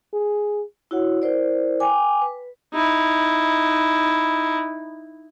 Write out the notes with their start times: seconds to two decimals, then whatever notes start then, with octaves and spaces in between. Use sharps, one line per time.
0.13 G#4
0.91 E4 F#4 C#5 F#5
1.22 E4 A#4 C5 D5
1.80 G5 G#5 D6
2.22 B4
2.74 D#4 E4